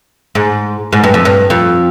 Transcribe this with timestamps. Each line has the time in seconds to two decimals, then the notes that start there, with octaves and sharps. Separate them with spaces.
0.35 G#2
0.93 G#2
1.04 G2
1.14 F2
1.25 G2
1.50 F2